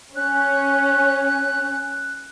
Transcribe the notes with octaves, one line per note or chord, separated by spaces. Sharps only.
C#4 F#6